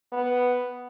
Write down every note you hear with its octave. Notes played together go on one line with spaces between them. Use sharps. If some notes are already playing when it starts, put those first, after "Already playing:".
B3